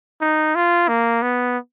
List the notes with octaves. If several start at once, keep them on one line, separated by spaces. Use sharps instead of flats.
D#4
F4
A#3
B3